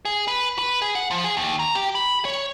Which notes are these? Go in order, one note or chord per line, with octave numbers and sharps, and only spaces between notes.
G#4
B4
B4
G#4
F#5
F3
G#4
D#2
A#5
G4
B5
C#5